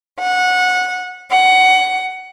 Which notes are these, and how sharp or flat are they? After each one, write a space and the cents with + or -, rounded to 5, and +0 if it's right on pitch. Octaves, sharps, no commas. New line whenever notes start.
F#5 -20
F#5 +15